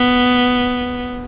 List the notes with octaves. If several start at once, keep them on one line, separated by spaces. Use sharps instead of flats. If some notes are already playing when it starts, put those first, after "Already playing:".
Already playing: B3